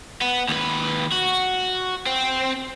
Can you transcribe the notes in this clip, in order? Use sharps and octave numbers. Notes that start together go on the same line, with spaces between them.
B3
D#2 B4
F#4
C4